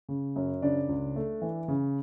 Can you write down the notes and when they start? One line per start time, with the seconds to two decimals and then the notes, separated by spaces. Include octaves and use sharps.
0.09 C#3
0.36 F#2
0.62 C#3 D4 D5
0.89 C#2
1.16 A3
1.42 E3
1.68 C#3